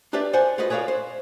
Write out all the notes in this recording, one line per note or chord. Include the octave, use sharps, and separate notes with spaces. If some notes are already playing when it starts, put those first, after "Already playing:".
D4 G4 B4 D5 E5
C5 D5 F#5 G#5
F4 F#4 G#4 B4 D#5
G#4 B4 C#5 D5 F5
C5